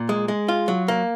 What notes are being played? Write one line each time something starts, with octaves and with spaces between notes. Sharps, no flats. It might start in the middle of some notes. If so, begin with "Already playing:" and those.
Already playing: A#2
G#3
G#3
F4
F#3
A#3